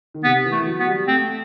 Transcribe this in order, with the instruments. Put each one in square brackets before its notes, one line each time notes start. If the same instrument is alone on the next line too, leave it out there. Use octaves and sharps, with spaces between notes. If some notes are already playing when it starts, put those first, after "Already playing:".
[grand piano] D#3
[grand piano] C3 [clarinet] B3
[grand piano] E3
[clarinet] A3
[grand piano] E3
F#3
[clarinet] B3
[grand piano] G3
[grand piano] A3 [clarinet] C4